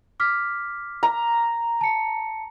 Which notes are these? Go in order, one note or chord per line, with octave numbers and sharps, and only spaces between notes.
D6 F6 B6
A#5
A5 C#7